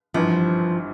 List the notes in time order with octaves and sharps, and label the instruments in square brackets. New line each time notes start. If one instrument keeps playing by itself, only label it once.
[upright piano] G#1 G2 E3 [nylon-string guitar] F3